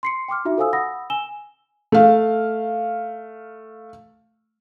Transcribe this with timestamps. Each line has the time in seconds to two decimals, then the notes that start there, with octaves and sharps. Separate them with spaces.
0.03 C6 C7 C#7
0.28 G5 C6 D6 F6
0.45 D#4 F4 F#4 E5
0.58 A4 C5 F5 G#5 D#6 E6
0.73 F#5 B5 D#6 E6 A#6
1.10 G#5 E6 E7 G7
1.92 A3 F5